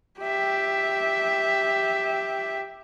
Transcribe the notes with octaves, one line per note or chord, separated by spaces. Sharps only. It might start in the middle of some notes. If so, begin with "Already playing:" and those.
G4 E5